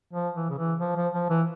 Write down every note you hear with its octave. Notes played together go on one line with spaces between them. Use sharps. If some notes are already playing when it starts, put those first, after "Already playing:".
F3
E3
C#3
E3
F3
F3
F3
E3